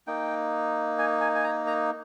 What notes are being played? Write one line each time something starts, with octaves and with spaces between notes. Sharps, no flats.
A#3 D#4 G5
G#5
G#5
G#5
A#5
A#5